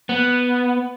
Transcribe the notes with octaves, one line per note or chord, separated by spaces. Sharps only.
B3